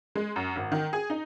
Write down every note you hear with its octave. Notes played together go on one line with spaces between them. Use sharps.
G#3
F#2
G#1
D#3
G#4
D#4